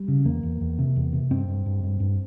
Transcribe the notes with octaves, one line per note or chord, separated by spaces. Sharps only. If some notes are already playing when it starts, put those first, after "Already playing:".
Already playing: G3
C#3
E2 A#3
E2
E2
C3
E2
C3
G2 C4
G2
G2
G2
G2